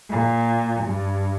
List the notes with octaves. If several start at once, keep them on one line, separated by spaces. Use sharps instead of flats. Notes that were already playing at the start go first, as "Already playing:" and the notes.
A#2
G2